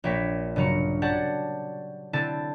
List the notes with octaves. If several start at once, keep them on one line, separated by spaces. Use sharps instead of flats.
A#1 A#3 C#5 G5 B6
G2 C#3 F#3 A#5 C#7
G4 C#5 D5 F#5 A5
D3 C4 E4 A5 A6 D7